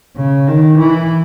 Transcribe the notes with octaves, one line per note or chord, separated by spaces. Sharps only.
C#3
D#3
E3